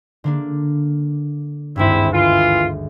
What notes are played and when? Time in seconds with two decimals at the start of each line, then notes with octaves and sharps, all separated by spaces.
0.24 D3 A#3 D4
1.76 G#1 D2 G2 C4 E4
2.11 E3 F4